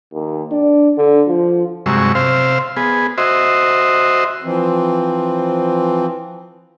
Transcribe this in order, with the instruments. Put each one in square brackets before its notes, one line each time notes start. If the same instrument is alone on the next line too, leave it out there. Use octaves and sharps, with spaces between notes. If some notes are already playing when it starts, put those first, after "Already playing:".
[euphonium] D#2
D4
D3
F3
[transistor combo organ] G2 C3 F#3 G#3 C#6 E6
C3 C5 F5 E6
B3 G#4
F#4 C5 D#5 E5
[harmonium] E3 F3 C4